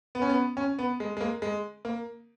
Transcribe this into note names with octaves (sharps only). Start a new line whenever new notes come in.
B3
C#4
B3
C#4
B3
G#3
G#3
A#3
G#3
A#3